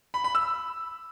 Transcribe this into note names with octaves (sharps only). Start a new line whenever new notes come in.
B5
B5
E6